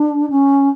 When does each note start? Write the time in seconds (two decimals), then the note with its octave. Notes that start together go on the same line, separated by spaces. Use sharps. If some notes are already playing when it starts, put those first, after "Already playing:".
Already playing: D4
0.30 C#4